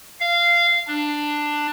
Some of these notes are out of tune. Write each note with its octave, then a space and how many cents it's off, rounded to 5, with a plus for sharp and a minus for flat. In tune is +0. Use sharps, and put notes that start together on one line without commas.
F5 -15
D4 +10